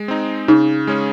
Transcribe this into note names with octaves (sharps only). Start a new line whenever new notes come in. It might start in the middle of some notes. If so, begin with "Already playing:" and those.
Already playing: G#3
C4 D#4
C#3 D#4
G#3 C#4 G#4